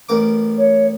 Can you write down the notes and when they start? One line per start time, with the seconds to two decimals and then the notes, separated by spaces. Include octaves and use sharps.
0.09 A1 A#4 D6
0.58 C#5